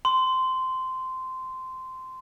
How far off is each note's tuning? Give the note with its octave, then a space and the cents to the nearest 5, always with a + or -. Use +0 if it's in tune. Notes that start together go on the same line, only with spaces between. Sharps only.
C6 -15